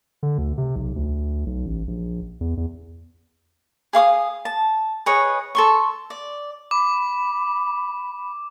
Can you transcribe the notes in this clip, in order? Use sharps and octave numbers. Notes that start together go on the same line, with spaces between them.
D3
D2
C3
B1
D2
B1
A1
A#1
E2
E2
G#4 F5 C#6 D#6
A5
G#4 B4 C#5 D#5
A4 C6 C#6
D5
B5 D6